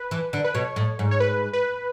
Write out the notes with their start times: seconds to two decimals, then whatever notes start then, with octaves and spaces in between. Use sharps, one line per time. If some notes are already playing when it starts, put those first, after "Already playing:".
Already playing: B4
0.11 E3
0.33 D3
0.44 B4
0.55 B2 C#5
0.76 A2
0.99 G#2
1.11 C#5
1.20 B4
1.53 B4